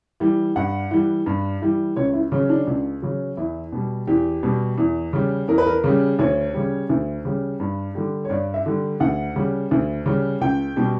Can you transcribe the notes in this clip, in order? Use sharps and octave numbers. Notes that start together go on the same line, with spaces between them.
E3 G3
G2 F#5
E3 G3
G2
E3 G3
C#2 C#5
E4
C#3 F#3 C#4
D4
C#2
C#3 F#3
E2 E4
B2 G3
E2 G4
B2 G3
E2
C#3 G3
E2 A#4
B4
A#4
C#3 G3
D2 C#5
C#3 G3
D2
C#3 G3
G2
D3 G3
C#5
G2 D5
E5
D3 G3
D2 F#5
C#3 G3
D2
C#3 G3
C#2 G5
B2 G3